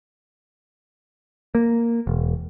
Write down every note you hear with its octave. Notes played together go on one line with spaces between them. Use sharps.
A#3
E1